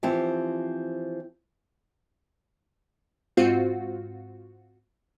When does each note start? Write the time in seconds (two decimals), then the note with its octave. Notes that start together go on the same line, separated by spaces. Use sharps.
0.03 E3 F3 C4 G4 C5
3.37 G#2 C4 F4 F#4